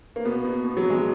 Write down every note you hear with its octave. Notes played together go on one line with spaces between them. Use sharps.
A#3
B2 B3
B2
B2
F#3
B2
G#3